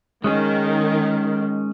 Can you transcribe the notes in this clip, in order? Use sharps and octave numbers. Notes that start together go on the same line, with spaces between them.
D#3 G#3 C#4 G#4